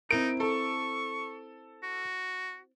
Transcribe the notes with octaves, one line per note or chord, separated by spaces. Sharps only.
C4 D#4 E4 A#4 D7
A4 C#6
F#4